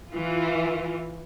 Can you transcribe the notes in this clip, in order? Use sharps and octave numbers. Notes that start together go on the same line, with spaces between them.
E3 F4